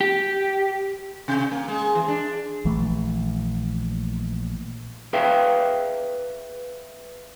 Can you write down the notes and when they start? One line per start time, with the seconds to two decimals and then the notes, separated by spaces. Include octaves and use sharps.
0.01 G4
1.28 C3
1.51 A#3
1.68 G#3
1.95 E3
2.08 D4
2.65 A#1 E3 A3
5.13 G#4 B4 E5 F5 G5